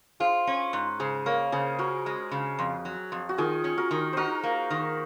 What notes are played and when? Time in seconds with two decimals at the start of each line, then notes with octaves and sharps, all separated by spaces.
0.20 F4 G#4 C5
0.47 C#4
0.73 G#2
1.00 C#3 G#4 C5
1.26 A#3 A#4 C#5
1.52 C#3 G#4 C5
1.79 C#4 F#4 A#4
2.06 G#3
2.31 C#3
2.59 F2
2.85 F#3
3.12 F2
3.29 F#4
3.38 D#3 F4 G#4
3.64 C#4
3.78 F#4 A#4
3.91 D#3
4.13 D#4 F#4 A#4 C5
4.43 A#3
4.70 D#3